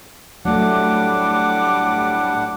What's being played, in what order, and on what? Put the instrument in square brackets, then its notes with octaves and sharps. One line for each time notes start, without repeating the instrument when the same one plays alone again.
[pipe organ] A2 G3 [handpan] F#3 A3 [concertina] D4 F#5 [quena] D6